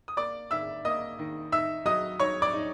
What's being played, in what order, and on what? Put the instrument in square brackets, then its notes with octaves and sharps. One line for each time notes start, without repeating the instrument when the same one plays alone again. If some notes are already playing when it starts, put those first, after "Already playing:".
[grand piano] D#6
A#3 D5 D6
D#3 E5 E6
A#3 D#5 D#6
D#3
D#4 E5 E6
F#3 D#5 D#6
D#4 C#5 C#6
D5 D6
D#4